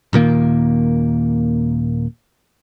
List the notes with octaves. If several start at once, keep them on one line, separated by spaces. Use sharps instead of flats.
D#1 A#2 D#3 A#3